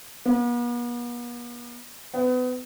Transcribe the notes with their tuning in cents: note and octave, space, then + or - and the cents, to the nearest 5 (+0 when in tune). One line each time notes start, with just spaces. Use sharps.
B3 -45
B3 +30